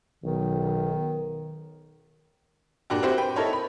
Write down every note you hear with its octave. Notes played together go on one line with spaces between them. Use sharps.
B1 D#3
A#2 D4 F#4 G4
C4 E4 F#4 G4 C5
B4 G5
D#4 E4 A4 A#4 C#5 B5
B5